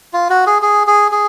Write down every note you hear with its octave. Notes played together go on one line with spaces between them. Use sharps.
F4
F#4
G#4
G#4
G#4
G#4